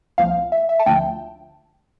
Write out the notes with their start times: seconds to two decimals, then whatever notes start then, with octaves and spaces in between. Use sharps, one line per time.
0.18 C2 A#2 F3 F5
0.52 E5
0.69 E5
0.79 A5
0.86 D2 D3 F3 G5